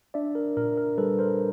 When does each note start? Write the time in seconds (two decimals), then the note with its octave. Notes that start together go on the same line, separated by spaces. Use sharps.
0.14 D4 D5 E5
0.35 A#4
0.57 A#2 A#4
0.77 A#4
0.98 G3 A4 B4
1.19 A#4 C5